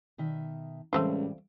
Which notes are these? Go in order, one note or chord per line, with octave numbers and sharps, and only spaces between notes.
B2 D#3 E5
C#2 A2 E3 G3 A3 C4 F4